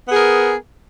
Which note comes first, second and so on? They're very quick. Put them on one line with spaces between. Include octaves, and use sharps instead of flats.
B3 G#4 A#4